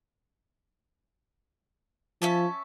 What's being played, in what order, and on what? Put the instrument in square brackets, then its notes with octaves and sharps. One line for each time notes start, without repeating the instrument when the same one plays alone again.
[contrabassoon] F3 [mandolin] C#4 E5 A5